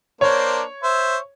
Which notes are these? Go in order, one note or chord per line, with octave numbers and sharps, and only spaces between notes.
A#3 D4 C5 C#5
C5 E5